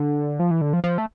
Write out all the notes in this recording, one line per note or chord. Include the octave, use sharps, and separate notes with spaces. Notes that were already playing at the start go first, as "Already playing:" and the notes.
Already playing: D3
F3
E3
D3
F3
F3
A3